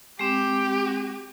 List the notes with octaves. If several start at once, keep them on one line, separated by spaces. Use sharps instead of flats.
G#3 C4 G4